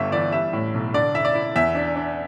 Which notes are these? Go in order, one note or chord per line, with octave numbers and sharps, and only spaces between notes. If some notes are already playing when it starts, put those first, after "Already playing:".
Already playing: G1 G2 A3 E5
E3 D5
G3 E5
A2
B1
D3 D5
E4 E5
D5
E4
E2 E5
D4
D4